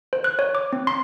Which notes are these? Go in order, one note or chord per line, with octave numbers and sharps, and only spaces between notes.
C5
F#6
C#5
D6
C4
C6